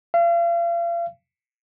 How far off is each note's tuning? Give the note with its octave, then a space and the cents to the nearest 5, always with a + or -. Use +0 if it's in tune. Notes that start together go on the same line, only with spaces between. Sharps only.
F5 -40